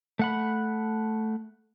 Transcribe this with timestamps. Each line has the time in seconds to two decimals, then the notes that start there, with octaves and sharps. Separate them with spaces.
0.19 A3 F#5 B5